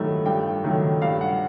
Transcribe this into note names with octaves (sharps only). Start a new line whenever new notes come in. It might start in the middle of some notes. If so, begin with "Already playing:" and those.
Already playing: G2 D#3 F#3 A3
G2 G5
D#3 F#3 A3
G2 F5
F#5